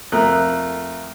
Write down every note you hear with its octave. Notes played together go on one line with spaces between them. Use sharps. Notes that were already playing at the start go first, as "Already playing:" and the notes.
F2 A3 A#4 F#6